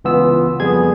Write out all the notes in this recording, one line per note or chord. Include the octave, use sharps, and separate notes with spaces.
C#2 E3 B3 F4 E6
F2 G3 B3 G#4 G#6